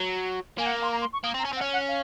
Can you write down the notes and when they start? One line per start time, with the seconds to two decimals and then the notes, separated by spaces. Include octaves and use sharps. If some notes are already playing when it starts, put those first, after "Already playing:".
Already playing: F#3
0.58 A#3 G#5
0.66 F#5
0.75 F5
0.82 C6
0.91 A#5
1.01 C6
1.13 C#6
1.24 A#3 D#6
1.34 C4
1.39 A#5
1.45 C#4 G#5
1.53 C4
1.56 F#5
1.61 C#4
1.73 F#5
1.88 F5